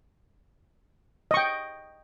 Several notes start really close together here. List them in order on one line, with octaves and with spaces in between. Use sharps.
D#5 C#6 G5